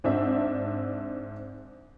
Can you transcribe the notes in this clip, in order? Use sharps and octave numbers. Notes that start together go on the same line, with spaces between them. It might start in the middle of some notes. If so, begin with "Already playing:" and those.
G#2 C4 D4 E5